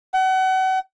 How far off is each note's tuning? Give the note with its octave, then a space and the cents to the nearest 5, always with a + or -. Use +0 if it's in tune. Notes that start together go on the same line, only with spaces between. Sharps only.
F#5 +35